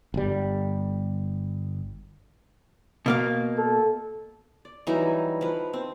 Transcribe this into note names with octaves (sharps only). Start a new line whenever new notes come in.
G1 G3
B2 A#3 F5
A4
D5
E3 F#3 G3 D#4
F3 B4
C4